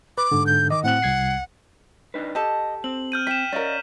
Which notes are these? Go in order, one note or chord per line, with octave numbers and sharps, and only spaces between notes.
B4 D6
G#2 D3
G6
D#3 D#5 D6
A2 C4 F#5 F#6
C2 G#6 C7
D4 D#4 B4
G4 A4 D#5 A5
C4 F#7
F6 G6 D#7
G5 B6 E7
C#4 A#4 D5 D#5 F5